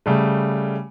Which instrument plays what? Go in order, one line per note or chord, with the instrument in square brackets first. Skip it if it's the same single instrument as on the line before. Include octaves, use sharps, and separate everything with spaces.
[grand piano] C#3 G3 A3